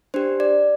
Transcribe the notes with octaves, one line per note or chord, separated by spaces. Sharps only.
D4 G4 C5
D5